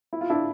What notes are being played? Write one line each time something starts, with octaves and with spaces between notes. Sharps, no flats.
E4
F4
D4 E4